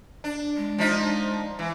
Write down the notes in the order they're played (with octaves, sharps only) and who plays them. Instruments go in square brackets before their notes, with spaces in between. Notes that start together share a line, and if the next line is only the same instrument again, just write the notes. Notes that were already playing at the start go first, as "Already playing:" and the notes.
[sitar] D4
[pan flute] G#3
[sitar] F3 D4 D#4
E3